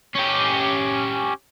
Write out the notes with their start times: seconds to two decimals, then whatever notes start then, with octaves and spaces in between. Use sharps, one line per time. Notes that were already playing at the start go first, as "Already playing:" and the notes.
0.15 C#4 G4